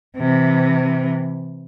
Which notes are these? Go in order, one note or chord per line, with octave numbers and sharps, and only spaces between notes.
C3 E3